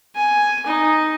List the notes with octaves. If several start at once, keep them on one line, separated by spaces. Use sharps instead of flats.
G#5
D#4